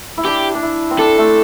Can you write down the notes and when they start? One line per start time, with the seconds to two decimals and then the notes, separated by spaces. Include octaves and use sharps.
0.18 E4
0.25 D4 G4
0.55 D4
0.63 E4
0.91 C4
0.99 D4 A4
1.18 A3